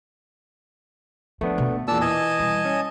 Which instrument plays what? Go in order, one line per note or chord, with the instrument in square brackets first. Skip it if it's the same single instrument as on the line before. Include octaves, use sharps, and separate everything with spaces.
[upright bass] F3 [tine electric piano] A3 B3 D4
[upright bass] B2
[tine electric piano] E2 A#2 [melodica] D4 A5 E6
[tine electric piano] E3 [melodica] D#5 G#5 A5
[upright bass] G3
[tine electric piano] C#4